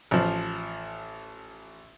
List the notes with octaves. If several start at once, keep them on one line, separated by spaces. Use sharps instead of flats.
A1 F3